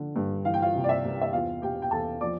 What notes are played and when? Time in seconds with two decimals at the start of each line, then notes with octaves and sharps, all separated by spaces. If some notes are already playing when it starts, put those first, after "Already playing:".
Already playing: D3 F3
0.16 G2
0.45 E3 F5
0.54 G5
0.62 F4 F5
0.75 C3
0.84 D5
0.89 E5
1.04 C2
1.21 E5
1.33 E2 F4 F5
1.62 B2 G4 G5
1.82 G5
1.91 E2 A4 A5
2.21 F3 D5 D6